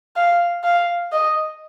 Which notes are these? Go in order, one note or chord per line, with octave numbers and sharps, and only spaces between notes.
F5
F5
D#5